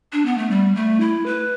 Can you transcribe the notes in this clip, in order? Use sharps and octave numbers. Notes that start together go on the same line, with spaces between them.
D4
B3
A3
G3
A3
E4
B4